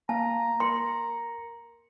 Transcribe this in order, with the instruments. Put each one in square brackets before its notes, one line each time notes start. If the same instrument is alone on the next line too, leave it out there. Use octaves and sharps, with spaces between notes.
[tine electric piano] A#3 F5 [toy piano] A5 [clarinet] A#5
[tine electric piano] A#4 C#7 [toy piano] C6